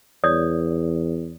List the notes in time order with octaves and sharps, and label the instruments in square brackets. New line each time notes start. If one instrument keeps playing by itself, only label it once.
[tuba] E2 [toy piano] C#5 D5 D#6